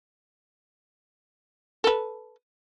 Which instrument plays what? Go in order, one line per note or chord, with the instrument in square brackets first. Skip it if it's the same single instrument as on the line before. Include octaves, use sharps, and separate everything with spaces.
[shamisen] A4 B4